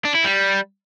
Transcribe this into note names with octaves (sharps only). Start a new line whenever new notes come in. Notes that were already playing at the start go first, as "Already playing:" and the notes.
D4
E4
G3